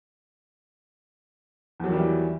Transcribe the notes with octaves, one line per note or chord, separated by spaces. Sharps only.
E2 D#3 E3 F#3 G3